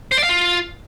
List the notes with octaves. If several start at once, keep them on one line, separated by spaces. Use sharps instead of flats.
C5
D5
F5
F4